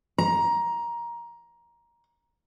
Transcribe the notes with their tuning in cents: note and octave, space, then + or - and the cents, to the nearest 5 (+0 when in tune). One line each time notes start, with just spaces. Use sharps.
A#5 +15